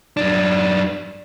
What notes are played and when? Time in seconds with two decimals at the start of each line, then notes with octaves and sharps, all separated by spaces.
0.17 F#2 D4